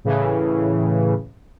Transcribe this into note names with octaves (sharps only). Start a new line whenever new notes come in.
A2 C#3 E3